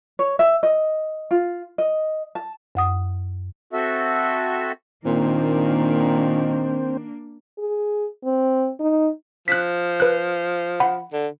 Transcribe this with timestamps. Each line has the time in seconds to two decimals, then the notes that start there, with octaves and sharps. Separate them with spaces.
0.19 C#5
0.39 E5
0.63 D#5
1.31 F4
1.78 D#5
2.35 A5
2.75 F#2 F#5 D#6
3.73 C4 F#4 A4 E5
5.05 A#2 D#3 A#3 C4 D4
7.59 G#4
8.25 C4
8.80 D#4
9.48 F3 F#6 B6
10.00 B4 F#6
10.80 F#5 B5
11.13 D3